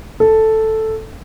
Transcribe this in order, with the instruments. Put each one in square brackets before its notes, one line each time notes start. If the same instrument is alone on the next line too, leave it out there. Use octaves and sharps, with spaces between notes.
[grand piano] A4